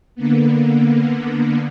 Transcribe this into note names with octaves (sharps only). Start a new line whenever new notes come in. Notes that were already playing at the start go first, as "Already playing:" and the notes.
D3 A#3 B3